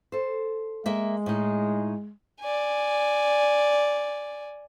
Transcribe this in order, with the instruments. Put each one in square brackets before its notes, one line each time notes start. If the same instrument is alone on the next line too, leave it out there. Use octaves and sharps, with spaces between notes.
[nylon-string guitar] A4 C5
[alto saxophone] G#3 [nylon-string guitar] A#3 E5
[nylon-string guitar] A2 D#4
[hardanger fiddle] D5 G#5